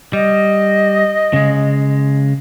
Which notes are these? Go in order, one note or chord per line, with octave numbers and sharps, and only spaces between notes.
G3 D#5
C#3 G#3